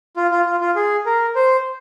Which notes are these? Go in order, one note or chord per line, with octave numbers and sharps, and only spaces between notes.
F4
F4
F4
F4
G#4
A#4
C5